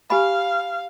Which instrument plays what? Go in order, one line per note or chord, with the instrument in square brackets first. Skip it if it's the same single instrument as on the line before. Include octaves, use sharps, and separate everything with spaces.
[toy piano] G4 G#5 B5 [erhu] F5